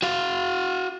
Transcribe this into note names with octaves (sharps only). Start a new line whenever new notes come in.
F#4 F5